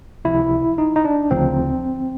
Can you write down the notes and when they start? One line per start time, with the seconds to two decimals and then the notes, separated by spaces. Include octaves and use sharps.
0.25 C#2 C3 F3 E4
0.78 D#4
0.96 D#4
1.05 D4
1.31 D2 C#3 F3 C4